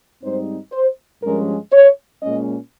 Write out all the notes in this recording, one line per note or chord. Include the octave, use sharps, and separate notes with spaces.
G#2 G3 C4 D#4 C5
C5
G2 F3 G#3 C#4 A#4
C#5
A#2 G#3 C#4 D#5